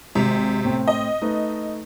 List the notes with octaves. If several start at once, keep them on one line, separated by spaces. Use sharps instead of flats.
G#1 G#2 C3
A2 C4
D#5
A3 D#4 B4